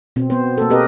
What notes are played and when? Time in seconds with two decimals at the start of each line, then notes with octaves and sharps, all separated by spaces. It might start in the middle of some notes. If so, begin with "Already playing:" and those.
0.16 B2 C4
0.30 B3 C5
0.58 A#3 A4
0.70 C4 G4 A#4 B4 D#5